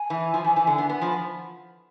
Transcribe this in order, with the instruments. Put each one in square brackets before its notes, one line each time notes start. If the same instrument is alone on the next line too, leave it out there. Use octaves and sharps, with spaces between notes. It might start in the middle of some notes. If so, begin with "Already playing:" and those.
Already playing: [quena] G#5
[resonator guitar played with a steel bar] E3
F3
E3
E3
D3
[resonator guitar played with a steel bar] B3 [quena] G#5
[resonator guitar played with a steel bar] B3
[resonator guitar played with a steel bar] F3 [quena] B5